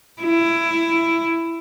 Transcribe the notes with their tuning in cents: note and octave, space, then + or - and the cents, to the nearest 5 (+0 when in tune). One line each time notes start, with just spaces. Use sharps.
E4 +15